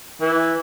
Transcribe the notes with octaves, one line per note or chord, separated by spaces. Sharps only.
E3